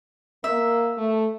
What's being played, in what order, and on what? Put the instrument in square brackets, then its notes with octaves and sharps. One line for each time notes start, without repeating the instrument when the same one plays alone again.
[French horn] A#3 [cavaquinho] E5
[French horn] A3